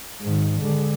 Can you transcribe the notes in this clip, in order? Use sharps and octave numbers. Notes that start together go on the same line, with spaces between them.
G#2 D#3
D3 G#3